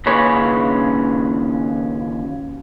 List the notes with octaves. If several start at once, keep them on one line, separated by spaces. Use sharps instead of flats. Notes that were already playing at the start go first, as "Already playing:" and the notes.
D#2 C#3 C#4 G#4 B4 C#5